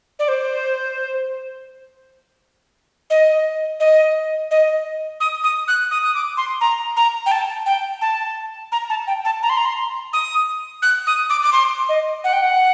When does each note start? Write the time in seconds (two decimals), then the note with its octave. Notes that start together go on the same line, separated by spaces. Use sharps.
0.19 D5
0.28 C5
3.10 D#5
3.80 D#5
4.51 D#5
5.20 D#6
5.44 D#6
5.68 F#6
5.91 D#6
6.03 D#6
6.14 D6
6.37 C6
6.61 A#5
6.96 A#5
7.26 G5
7.32 A5
7.66 G5
8.01 A5
8.72 A#5
8.90 A5
9.07 G5
9.25 A5
9.43 A#5
9.49 C6
9.57 A#5
9.65 C6
10.13 D#6
10.82 F#6
11.07 D#6
11.30 D6
11.42 D6
11.53 C6
11.89 D#5
12.24 F#5
12.33 G5
12.42 F#5